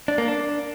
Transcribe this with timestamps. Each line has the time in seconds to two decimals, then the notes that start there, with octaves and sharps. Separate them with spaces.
0.08 D4
0.18 A#3
0.28 D4